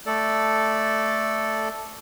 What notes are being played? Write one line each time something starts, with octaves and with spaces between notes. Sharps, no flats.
A3 A4 D5